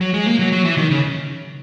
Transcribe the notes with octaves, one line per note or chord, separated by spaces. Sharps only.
F#3
G#3
A#3
F#3
F#3
E3
D#3
C#3